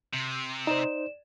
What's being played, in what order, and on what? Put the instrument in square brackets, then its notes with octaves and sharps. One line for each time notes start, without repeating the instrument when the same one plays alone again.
[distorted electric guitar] C3
[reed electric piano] D#4 C5 [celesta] D5 E7